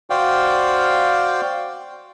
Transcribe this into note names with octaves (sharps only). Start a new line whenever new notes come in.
F#4 C5 D5 F5 G5